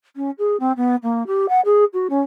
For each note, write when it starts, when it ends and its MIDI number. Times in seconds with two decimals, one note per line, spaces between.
0.16 0.31 61
0.39 0.57 68
0.60 0.72 60
0.77 0.96 59
1.03 1.24 58
1.27 1.46 67
1.49 1.61 78
1.65 1.85 68
1.94 2.08 66
2.10 2.21 61